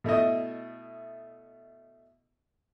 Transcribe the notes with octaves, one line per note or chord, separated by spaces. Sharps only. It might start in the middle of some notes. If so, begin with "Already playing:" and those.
B2 A3 E4 D#5